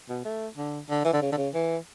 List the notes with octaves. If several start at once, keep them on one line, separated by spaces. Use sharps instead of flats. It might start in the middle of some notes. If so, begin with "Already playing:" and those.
B2
A3
D3
D3
E3
D3
C#3
D3
C#3
E3